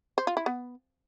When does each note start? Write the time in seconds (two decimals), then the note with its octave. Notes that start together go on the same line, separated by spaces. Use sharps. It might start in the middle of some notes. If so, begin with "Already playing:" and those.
0.18 C5
0.27 F4
0.37 E4
0.46 B3